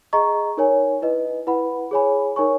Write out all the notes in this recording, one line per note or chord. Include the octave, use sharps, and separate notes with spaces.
G#4 D#5 A#5 C#6
D#4 A#4 C#5 G#5
E4 B4 D#5
E4 B4 F#5 B5
G#4 C#5 G#5 B5
D#4 A#4 C#5 G#5 C#6